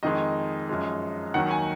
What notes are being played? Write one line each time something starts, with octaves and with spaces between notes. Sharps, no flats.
F2 D#3 G#3 D#5
F#2 F3 G#3
D#2 D#3 F#3 F#5
G#5